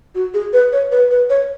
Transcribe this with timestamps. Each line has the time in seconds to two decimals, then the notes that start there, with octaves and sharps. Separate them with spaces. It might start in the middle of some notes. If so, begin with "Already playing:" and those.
0.15 F#4
0.34 G#4
0.53 B4
0.73 C#5
0.92 B4
1.11 B4
1.30 C#5